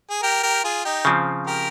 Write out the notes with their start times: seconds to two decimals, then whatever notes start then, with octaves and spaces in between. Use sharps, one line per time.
0.10 G#4
0.22 G4 A#4
0.43 G4 A#4
0.64 F4 G#4
0.85 D#4 G4
1.05 C#3 F3 C4
1.47 G4 A#4